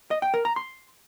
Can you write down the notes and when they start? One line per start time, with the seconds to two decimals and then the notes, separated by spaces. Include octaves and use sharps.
0.11 D#5
0.22 G5
0.34 A#4
0.45 A#5
0.56 C6